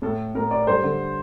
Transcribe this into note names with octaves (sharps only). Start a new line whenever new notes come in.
A2 A4
A2 A#4
D5
G2 C5
D3